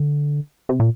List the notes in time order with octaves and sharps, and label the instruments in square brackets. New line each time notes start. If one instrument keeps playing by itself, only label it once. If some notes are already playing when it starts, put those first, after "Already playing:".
Already playing: [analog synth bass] D3
C3
A#2